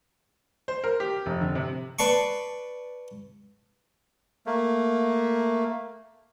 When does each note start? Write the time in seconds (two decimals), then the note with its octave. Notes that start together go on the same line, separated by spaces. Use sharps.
0.68 C5
0.84 A#4
1.00 G4
1.26 F1
1.41 D3
1.55 C3
1.99 B4 D5 A5 C6 C#6
4.47 A3 A#3